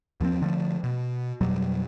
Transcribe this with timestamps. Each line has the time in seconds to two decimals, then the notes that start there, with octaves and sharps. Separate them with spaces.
0.20 D#2 F3 B3 C4
0.42 D3 F3 A3
0.84 B2
1.41 F2 B2 F#3 G3